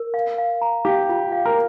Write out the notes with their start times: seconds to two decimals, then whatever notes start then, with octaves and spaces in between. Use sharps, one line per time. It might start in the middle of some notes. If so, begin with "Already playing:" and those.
Already playing: A#4
0.14 F5
0.38 F5
0.61 A#5
0.85 G4 F5
1.09 F4
1.32 F5
1.45 A#4